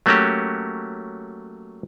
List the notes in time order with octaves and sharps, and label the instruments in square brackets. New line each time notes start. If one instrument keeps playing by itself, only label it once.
[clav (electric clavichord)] F#3 A3 A#3 C#4 F#4 G4